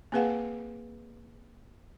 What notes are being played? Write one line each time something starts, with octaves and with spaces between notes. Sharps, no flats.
A#3 C4 G#4 B4 F5 F#5